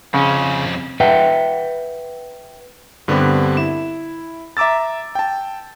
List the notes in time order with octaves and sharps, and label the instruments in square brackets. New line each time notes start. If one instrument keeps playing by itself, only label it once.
[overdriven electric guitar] F2 C#4 [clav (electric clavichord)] C#3 F#5
[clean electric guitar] B4 E5 F#5 G5
[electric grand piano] G2 D3 B3 C4 D4 G4
E4 E7
E5 A#5 D6 E6 A6
G5 A5